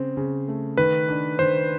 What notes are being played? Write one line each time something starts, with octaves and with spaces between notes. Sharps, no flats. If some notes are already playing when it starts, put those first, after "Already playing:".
Already playing: C#3 C4
C#3
A3
D#3 B4
D4
D#3 C5